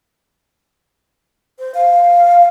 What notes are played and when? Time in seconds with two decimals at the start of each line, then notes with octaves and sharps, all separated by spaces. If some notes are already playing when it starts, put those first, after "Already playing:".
1.59 C5
1.74 F5